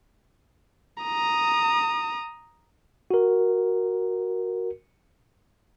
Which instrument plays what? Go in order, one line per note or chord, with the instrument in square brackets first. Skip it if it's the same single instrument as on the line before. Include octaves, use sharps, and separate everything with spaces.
[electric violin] A#5 D#6
[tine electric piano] F#4 A#4